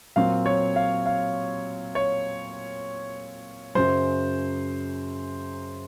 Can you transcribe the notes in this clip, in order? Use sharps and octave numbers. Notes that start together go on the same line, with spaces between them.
A#2 F#3 C4 F5
C#5
F5
F5
C#5
F#2 C#3 F#3 C5